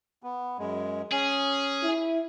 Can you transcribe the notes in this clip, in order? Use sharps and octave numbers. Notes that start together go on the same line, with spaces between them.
B3
F#2 G#3
C#4 G#4
E4